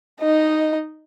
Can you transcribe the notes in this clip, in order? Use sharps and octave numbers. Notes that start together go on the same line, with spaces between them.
D#4 D#5